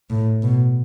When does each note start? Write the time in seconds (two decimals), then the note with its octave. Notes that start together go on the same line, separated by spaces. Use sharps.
0.10 A2
0.42 B2